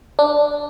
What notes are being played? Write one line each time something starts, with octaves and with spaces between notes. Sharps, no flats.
D4